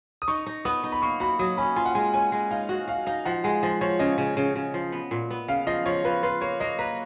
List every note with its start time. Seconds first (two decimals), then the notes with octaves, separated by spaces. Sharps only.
0.22 D#6
0.28 D#4 C#6
0.46 D#4
0.65 B3 D#6
0.84 D#4
0.92 B5
1.02 A#3 C#6
1.20 F#4 B5
1.39 F#3 D#6
1.57 C#4 B5
1.76 F4 G#5
1.86 F#5
1.95 G#3 G#5
2.14 C#4 G#5
2.32 G#3
2.51 D#4 F5
2.69 F#4 D#5
2.88 F#4 F5
3.06 D#4 F5
3.25 F3 F#5
3.44 G#3 F#5
3.63 F3 D#5
3.81 F3 C#5
3.99 C#3 D#5
4.18 C#3
4.37 C#3
4.56 C#3
4.74 F3
4.92 B3
5.11 A#2
5.31 B3
5.48 C#3 F5
5.67 F3 D#5
5.86 F3 C#5
6.05 F3 B4
6.23 F4 B4
6.41 A#3 C#5
6.60 A#3 D#5
6.79 B4 A#5